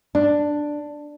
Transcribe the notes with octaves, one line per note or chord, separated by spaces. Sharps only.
D4